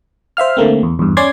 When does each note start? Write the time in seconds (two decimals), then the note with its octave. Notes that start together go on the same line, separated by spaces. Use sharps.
0.37 C5 E5 F5 F6
0.57 D3 A3 A#3 C4
0.83 E2
0.99 E2 G2
1.17 C#4 D5 C6 G#6